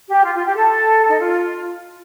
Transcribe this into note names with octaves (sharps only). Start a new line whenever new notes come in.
G4
F4
F4
G4
A4
D#4
F4